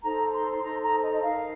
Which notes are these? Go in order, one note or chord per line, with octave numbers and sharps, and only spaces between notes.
D#4 A4 C5 A#5
C6
C6
D#4 A4 C5 A#5
A#5
D#5
D#5
D#4 A#4 F5